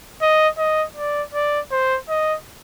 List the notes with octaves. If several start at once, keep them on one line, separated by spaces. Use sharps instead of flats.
D#5
D#5
D5
D5
C5
D#5